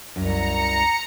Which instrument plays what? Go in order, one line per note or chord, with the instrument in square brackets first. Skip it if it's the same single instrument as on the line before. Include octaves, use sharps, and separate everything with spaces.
[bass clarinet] C2 [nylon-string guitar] F#2 [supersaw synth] A#5 C#7